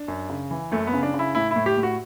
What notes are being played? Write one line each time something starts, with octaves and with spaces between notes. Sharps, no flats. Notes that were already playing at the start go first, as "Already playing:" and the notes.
Already playing: D4
F#2
C#3
E3
F#2 A3
B3
C#3
D4
C#3
E4
A2 E4
E4
A2
G4
A2
F#4